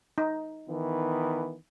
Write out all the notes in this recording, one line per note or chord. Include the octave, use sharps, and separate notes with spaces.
D#4
D#3 E3 B3